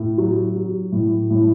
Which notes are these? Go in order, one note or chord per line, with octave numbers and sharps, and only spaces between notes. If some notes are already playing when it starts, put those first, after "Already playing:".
Already playing: A2
F#3
F#3
A2
A2